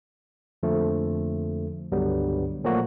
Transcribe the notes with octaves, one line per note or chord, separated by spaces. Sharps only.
F2 D3 F3 A3 A#3
C#2 G2 D3 F#3 G3 B3
A#2 F3 F#3 A3 A#3 F#4